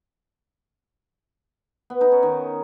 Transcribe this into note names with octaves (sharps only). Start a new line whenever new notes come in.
B3
D#4
C#4
D#3